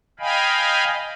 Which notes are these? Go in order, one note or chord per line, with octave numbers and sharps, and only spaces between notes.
D#5 F5 G5 G#5 B5